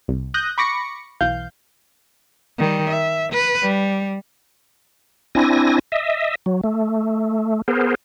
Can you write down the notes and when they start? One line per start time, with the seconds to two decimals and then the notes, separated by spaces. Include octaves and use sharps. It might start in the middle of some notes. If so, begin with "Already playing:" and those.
0.08 C2
0.34 D#6 F#6 G6 A#6
0.58 B5 C#6 D6 A#6 C#7
1.21 B1 E3 F5 G6
2.58 D#3 G3
2.89 E5
3.32 B4
3.62 G3
5.35 C4 D4 E4 G#5 A#6
5.92 D#5 E5
6.46 F#3
6.64 A3
7.68 B3 G#4 A#4 C5